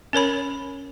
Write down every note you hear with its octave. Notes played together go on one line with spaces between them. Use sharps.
C#4 A#4 C#5 B5